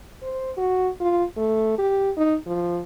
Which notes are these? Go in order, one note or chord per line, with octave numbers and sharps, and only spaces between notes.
C5
F#4
F4
A3
G4
D#4
F3